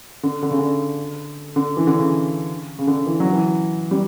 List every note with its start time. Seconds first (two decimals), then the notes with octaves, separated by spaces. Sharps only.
0.23 D3
0.42 D3
0.51 C#3
0.59 D3
1.56 D3
1.77 E3
1.87 D3
1.99 C#3
2.79 C#3
2.87 D3
3.06 E3
3.20 F#3
3.33 E3
3.91 G3